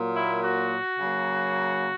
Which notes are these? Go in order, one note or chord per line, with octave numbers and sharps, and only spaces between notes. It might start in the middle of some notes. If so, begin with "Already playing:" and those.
Already playing: A#2 F#3 A#3
E4
F#4
C#3 F#3 A#3